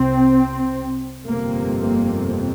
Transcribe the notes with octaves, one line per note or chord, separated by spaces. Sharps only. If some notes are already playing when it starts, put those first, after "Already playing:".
Already playing: C2 C3 C4
G1 F2 C3 A#3
A#3